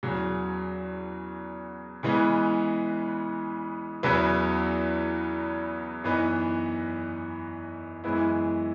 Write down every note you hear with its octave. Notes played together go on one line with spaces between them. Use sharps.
E2 C#3 F#3
C#3 E3 G#3 B3
E2 C#3 F#3 B3 E4
F#2 E3 B3 D#4
F#2 E3 G#3 B3 E4